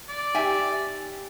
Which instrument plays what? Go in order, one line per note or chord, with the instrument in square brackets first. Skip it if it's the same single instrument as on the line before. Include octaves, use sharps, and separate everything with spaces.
[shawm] D5
[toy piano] D#4 G4 [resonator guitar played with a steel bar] E5 G5 G#5